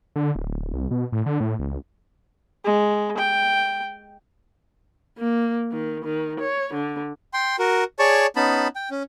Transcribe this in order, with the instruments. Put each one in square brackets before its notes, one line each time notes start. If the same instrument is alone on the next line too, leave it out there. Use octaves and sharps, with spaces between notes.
[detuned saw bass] D3
D1
C2
B2
A2
D3
A2
C#2
[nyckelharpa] G#3
G5
[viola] A#3
D#3
D#3
C#5
D3
[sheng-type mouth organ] G5 C6
F#4 A#4
G#4 C#5 D5 A5 C#6
B3 C#4 D#4 A5 B5
G5
C#4